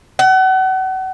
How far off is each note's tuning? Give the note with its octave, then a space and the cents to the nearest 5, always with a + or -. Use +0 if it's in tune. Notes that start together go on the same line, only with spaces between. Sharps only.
F#5 +35